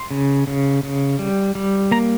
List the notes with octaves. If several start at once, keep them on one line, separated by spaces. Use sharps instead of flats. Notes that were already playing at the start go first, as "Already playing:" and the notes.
Already playing: C6
C#3
C#3
C#3
G3
G3
A#3 A#5